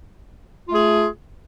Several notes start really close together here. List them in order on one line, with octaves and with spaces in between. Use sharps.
F4 A3 G#4